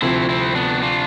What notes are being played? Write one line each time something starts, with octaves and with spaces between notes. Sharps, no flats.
D2 C3 F3 C4 E4
C4 E4
B3 D4
D4 F4